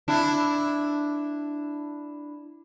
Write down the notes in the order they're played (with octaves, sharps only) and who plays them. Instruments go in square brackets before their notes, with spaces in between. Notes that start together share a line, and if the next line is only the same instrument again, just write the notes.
[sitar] D4 E4